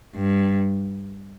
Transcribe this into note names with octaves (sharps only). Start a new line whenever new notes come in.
G2